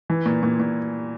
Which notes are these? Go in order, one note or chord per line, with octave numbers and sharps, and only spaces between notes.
E3
A#2
A#2
A#2